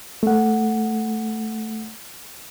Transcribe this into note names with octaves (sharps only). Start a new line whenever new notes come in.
A3 F#5